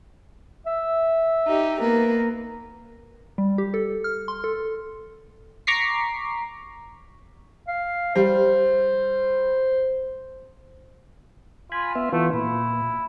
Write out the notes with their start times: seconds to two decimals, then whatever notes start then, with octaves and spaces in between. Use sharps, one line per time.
0.66 E5
1.47 D#4 G4
1.81 A#3 B3 A#4
3.38 G3
3.58 G4
3.74 A4
4.04 F6
4.28 C6
4.44 A4
5.67 A#5 C#6 D6 B6 C7
7.68 F5
8.16 G3 C5
11.72 F4 G#5 B5
11.95 B3 E5
12.12 E3 A3 B3 F4
12.33 A#2 E4